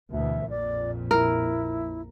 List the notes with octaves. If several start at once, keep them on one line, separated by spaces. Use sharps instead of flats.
D2 B2 E3 E5
A#1 F2 A#2 D5
E4 A#4